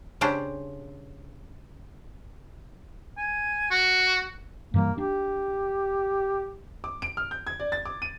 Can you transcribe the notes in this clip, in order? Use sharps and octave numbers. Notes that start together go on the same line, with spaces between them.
C#3 C#4 D4 G4 C5
G#5
F#4
G2 E3 G3 A#3
D4 G4
D6
D7
F6
G6
G#6
D5
A6
D6
D#7